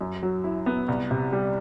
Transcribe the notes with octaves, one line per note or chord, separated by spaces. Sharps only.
F#2
F#3
E4
B3
C2
C3
G3